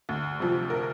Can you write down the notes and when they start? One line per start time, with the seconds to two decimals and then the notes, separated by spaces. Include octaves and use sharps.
0.09 D2
0.40 C3 F3
0.70 A#4